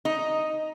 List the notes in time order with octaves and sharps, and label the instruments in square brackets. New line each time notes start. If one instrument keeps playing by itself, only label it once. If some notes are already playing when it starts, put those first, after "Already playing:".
[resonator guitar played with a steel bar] D#4